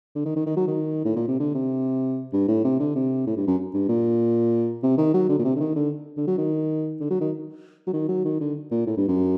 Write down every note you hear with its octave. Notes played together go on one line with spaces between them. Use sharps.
D3
D#3
D#3
D#3
F#3
D#3
A2
A#2
C3
D3
C3
G2
A2
C3
D3
C3
A2
G2
F#2
G2
A#2
C3
D#3
F#3
D3
A#2
C3
D3
D#3
D3
D3
F#3
D#3
D3
F#3
D#3
F#3
D#3
F#3
D#3
D3
A#2
A2
G2
F#2